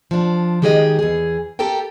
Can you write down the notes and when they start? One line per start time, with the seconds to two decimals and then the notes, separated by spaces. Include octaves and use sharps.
0.11 F3 D4
0.62 D#3 G#3 G4 G#4 D5 D#5
0.99 E2 G#4
1.59 G4 A4 A#4 G5